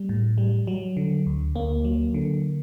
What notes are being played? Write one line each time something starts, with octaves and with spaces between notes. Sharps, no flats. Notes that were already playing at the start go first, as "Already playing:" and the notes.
Already playing: G3
A2
G3
F#3
D3
D2
D2 A#3
F#3
D3